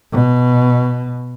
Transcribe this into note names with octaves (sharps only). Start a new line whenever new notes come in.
B2